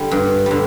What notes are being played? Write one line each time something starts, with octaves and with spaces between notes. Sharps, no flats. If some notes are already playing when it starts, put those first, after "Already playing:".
Already playing: D3 G3
G2
D3 G3